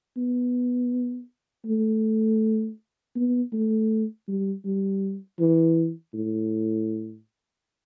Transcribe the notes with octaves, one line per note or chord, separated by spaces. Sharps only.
B3
A3
B3
A3
G3
G3
E3
A2